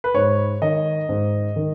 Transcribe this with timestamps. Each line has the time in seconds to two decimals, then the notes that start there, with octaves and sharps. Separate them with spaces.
0.04 B4
0.15 G#2 C#5
0.62 D#3 D#5
1.09 G#2
1.56 D#3